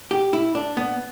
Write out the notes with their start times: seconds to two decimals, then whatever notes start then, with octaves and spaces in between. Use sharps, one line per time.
0.11 G4
0.33 E4
0.55 D4
0.77 B3